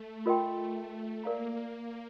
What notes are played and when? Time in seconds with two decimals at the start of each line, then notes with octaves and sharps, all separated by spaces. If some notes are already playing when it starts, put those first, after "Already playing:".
Already playing: A3
0.26 F4 A#4 D#5 G5 C6
0.75 A3
1.24 A#3 A#4 D5 F5 A#5